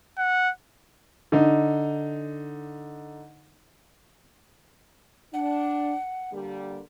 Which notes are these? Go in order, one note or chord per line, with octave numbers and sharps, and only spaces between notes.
F#5
D3 D#4
D4 F#5
D3 G3 A#3